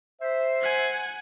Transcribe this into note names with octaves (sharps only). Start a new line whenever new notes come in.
C5 E5
F#5 G#5